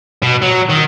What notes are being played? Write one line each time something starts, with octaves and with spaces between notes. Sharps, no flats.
B2
F#3
D#3